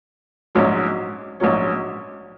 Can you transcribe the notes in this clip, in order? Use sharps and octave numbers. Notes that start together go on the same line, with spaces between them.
A#1 G#2 F#3 C#4
A#1 G#2 F#3 C#4